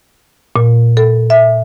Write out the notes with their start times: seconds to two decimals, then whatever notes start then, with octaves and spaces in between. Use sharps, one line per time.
0.56 A#2
0.97 A4
1.30 E5